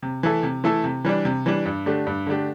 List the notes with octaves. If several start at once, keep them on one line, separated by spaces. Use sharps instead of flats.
C3
E3 A3 E4 A4
C3
E3 A3 E4 A4
C3
E3 G3 D4
C3
E3 G3 D4
G2
D3 A3 D4 G4
G2
D3 A3 D4 G4